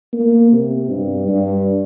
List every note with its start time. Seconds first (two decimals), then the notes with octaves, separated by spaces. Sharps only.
0.13 A#3
0.52 C3
0.90 G2
1.28 G2